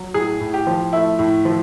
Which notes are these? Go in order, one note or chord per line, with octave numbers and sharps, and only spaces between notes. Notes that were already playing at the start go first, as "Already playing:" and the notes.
Already playing: F#3
A2 G#4
A2
G4
F3
A3 E4
A2
F3